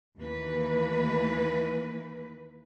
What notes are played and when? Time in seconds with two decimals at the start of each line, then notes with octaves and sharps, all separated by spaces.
0.18 D#2 E3 A#3 B4